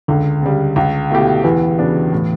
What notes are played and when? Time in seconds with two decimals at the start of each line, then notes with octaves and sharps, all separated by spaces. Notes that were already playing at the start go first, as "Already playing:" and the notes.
0.08 C#2 D3
0.42 C#3 G3
0.76 C#2
1.11 B2 A3 E4 G4
1.44 E2 E3
1.78 C#3 F#3 B3 D4
2.12 A2